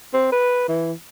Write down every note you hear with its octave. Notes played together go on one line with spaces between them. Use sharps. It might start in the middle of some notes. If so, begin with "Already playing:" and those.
C4
B4
E3